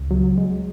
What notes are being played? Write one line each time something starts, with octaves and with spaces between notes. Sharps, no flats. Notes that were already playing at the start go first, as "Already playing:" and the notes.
Already playing: C#2
F#3
G#3